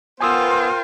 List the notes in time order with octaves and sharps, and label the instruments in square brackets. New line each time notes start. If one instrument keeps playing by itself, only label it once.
[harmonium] B3 [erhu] F4 [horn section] A#4 C5 G5 [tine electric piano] G#5 D#6 E6